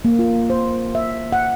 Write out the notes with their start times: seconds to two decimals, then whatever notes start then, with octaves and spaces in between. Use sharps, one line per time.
0.05 A#3
0.19 F4
0.50 C5
0.95 E5
1.32 F#5